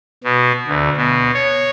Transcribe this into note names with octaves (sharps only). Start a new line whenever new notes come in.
B2
D2
B2
C#5